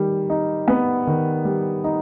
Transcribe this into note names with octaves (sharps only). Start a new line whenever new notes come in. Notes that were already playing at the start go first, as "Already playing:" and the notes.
Already playing: D#3 G3
D#4
B3
D#3
G3
D#4